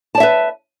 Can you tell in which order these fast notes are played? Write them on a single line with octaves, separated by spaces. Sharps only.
A5 D5 E5 B4